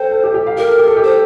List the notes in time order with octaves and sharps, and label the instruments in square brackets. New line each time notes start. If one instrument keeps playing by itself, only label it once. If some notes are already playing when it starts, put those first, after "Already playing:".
Already playing: [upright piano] A4 G5 [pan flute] C5
[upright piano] A4
G4
G4
F5
[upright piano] G4 [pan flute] A#4
[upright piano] A4
G4
A4
G4
[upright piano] A4 [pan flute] C5